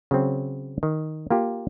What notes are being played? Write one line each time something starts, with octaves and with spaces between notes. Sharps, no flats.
C#3 F#3 C4
D#3
A#3 F4 G4